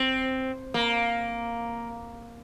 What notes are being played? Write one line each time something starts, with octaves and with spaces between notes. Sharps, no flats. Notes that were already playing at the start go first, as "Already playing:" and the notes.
Already playing: C4
A#3